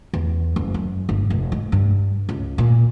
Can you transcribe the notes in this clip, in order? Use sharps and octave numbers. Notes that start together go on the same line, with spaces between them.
E2
F#1
F#2
G1
F1
G#2
G2
C#2
A#2